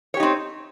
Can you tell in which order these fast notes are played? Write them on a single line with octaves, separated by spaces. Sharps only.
C#5 G4 D#4 C4